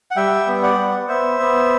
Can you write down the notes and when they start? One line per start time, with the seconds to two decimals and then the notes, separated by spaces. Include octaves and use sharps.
0.11 F#5
0.16 G3 E5 G5
0.47 B3
0.63 D5 F#5
0.78 B3
1.08 B3 C5 E5
1.40 B3